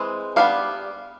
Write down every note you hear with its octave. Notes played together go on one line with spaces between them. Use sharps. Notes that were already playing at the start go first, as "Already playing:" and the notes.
Already playing: E3 G#3 C4
G3 B3 D4 F5